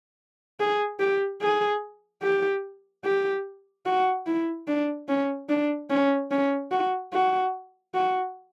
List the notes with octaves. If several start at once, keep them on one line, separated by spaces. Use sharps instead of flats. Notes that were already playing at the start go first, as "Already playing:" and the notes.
G#4
G4
G#4
G4
G4
F#4
E4
D4
C#4
D4
C#4
C#4
F#4
F#4
F#4